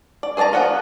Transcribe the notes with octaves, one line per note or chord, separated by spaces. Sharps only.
D5
G#4 C5 D5 A5 A#5
F3 B3 F#5 A#5